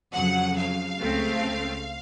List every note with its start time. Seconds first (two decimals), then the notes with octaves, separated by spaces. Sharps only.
0.14 F2 C#3 F#3 F#5
0.57 F5
1.01 C#2 C#3 A3 C4